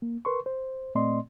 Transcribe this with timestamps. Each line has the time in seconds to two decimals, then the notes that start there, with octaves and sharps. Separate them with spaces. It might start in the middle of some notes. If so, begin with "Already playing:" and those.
0.02 A#3
0.25 A#4 B4 C6 C#6
0.46 C5
0.95 A#2 A3 C4 D5 D#5 C6